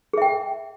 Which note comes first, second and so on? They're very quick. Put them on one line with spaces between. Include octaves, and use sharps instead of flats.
G#4 E5 G5